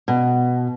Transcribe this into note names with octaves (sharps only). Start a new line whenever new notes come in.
B2